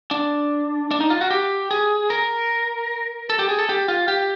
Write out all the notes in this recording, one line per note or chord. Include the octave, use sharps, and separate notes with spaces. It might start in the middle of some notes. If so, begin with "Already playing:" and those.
D4
D4
D#4
F4
F#4
G4
G#4
A#4
A4
G4
G#4
A4
G4
F4
G4